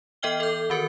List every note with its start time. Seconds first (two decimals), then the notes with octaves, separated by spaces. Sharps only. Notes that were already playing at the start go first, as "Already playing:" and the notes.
0.23 E3 B3 D#5 G5 F6 G7
0.40 A4 G6
0.70 D#3 F#4 A#4 C#7